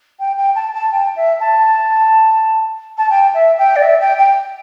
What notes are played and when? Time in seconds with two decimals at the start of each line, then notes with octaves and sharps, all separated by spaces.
0.19 G5
0.37 G5
0.55 A5
0.73 A5
0.91 G5
1.16 E5
1.40 A5
2.97 A5
3.10 G5
3.34 E5
3.58 G5
3.76 D5
3.82 E5
4.00 G5
4.18 G5